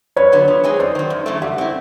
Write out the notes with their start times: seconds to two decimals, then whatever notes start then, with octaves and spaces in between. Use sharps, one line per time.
0.16 F#2 B4 C#5
0.32 D3 F#3 B3
0.48 F3
0.64 G#3 C4 D#4 G#4
0.79 F#2 C5 D5
0.95 D#3 F#3
1.10 F#2
1.26 C#3 E3 A3
1.42 G3 E5 F#5
1.58 C4 E4